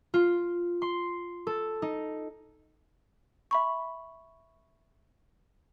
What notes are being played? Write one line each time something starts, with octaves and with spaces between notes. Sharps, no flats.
F4
C6
A4
D#4
E5 B5 C#6